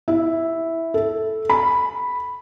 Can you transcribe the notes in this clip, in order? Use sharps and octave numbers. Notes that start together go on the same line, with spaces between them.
E4
A4
B5